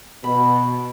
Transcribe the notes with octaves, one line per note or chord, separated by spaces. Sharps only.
B2 B5